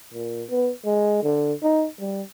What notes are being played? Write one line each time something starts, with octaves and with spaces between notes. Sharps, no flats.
A#2
B3
G#3
D3
D#4
G3